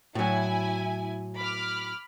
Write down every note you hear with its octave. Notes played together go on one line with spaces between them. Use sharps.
A2 F#3 E4 G#5
B5 D6 F6